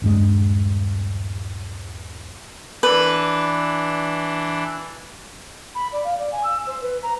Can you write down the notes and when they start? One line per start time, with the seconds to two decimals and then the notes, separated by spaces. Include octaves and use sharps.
0.02 D#1 G2 G#3
2.83 E3 D4 B4
5.75 B5
5.92 D5
6.04 F5
6.17 D5
6.32 G#5
6.43 E6
6.67 C5
6.81 B4
7.02 A#5